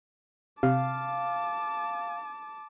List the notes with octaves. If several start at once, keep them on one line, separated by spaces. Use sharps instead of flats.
C3 F5 A5 D6